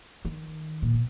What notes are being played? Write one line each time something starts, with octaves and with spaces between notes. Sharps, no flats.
D#3
A#2
B2